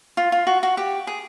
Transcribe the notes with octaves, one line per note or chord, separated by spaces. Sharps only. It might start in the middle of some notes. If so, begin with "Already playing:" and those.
F4
F4
F#4
F#4
G4
G#4